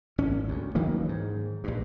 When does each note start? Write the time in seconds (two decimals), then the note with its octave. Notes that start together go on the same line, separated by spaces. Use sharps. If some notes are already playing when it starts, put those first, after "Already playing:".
0.18 G#1 C#4
0.49 D2
0.75 D#3 E3 F#3 A#3
1.09 G#2
1.64 A#1 G2